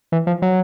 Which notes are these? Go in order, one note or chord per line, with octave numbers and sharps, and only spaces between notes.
E3
F3
F#3